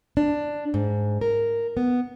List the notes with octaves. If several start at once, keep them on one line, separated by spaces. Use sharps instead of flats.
D4
G#2
A#4
B3